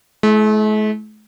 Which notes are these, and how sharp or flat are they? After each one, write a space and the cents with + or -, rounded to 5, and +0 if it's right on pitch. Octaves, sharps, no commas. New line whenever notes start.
A3 -45 E4 +0